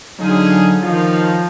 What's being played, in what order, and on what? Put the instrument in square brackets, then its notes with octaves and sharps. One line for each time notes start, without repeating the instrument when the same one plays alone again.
[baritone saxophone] D3 [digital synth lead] F#3 [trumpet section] C#4 F4 G#4 [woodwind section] D#4
[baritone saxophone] D#3 [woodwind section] F3 [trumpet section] D#4 C#5 F5 [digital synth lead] F4